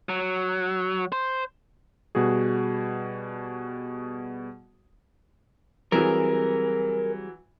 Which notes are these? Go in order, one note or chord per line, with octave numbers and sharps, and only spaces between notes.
F#3
C5
B2 G3 F#4 G#4
E3 F#3 G3 C4 G#4 A#4